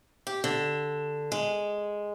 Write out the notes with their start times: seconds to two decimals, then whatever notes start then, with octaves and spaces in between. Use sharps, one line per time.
0.27 G4
0.44 D3
1.32 G#3